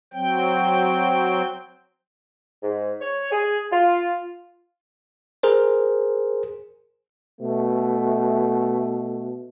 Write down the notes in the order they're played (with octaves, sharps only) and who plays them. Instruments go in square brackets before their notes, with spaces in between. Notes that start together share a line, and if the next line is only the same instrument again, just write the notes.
[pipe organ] F#3 C4 G5
[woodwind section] G#2
C#5
G#4
F4
[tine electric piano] G#4 A#4 C5
[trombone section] B2 A3